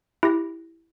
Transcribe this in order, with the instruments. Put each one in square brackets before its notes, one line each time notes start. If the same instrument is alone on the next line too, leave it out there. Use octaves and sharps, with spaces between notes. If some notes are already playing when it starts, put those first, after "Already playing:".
[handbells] E4 G4 A#6